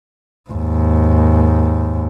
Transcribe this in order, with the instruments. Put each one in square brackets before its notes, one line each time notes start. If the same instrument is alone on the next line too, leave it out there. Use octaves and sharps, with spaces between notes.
[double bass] D#2 G#2